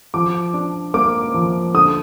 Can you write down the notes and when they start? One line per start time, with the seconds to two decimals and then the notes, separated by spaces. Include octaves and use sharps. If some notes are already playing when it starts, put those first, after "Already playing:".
0.14 F3 D6
0.54 D4
0.94 A#3 D6
1.34 F3
1.74 D3 D#6